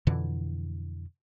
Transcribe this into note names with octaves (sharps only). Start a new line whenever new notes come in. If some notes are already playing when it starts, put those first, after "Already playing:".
F2 B2 D3 E3